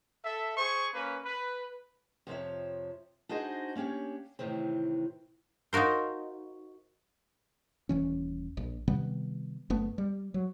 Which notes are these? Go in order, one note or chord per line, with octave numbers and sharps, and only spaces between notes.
A4 E5
G#4 C5 C#6
A#3 C#4 B4
B4
F2 C3 F3 C#5 E5
D4 D#4 F#4 G#4 C5 D#5
A#3 C#4 D4 G4 C#5
A2 C3 D#3 E3 C4
D#4 F4 F#4 A#4 C5
D#1 E3 C#4
A#1
C3 D#3 G3 B3
F#1 A3 B3
G3
F#3